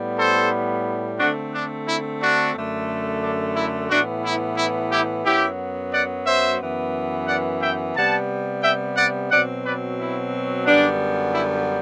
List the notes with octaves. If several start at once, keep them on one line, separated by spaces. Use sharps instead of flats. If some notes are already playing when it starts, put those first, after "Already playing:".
Already playing: A2 G3 B3
A4 C5
D3 A3 C4 D4 F#4
D4
E4
D4 F#4
F#2 D3 A3
D4
E4
A2 E3 B3 D4 F#4
E4
E4
E4 G4
F#2 F#3 B3 E4 G4
D5 F#5
C5 E5
F#2 E3 B3
D5 F#5
E5 G5
C3 G3 B3 F#5 A5
E5 G5
D5 F#5
B2 F#3 C4 D5 F#5
B4 D5
E4
F#2 D3 G3 B3 D4
E4